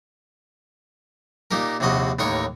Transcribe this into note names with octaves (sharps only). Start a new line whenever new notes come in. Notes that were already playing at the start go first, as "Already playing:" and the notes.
A#2 D#4 G4 A#4
A#1 D#2 C3 F#4 D#5
A1 D#2 D#4 A#4 C#5 C#6